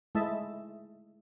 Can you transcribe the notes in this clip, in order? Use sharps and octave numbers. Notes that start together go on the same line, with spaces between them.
G#3 A3 E4 D#5 E5 A5